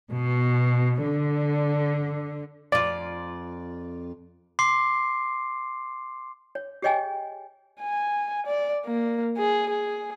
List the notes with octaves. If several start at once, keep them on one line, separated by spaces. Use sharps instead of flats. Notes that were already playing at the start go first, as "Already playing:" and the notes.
B2
D3
F2 F4 D5
C6 D6 C7
C#5
G4 G#4 C#5 D#5 G5 G#5
G#5
D5
A#3
G#4
G#4